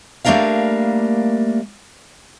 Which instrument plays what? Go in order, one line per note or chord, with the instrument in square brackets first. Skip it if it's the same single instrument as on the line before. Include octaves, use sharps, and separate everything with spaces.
[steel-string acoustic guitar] G3 A3 A#3 D4 A#4 F5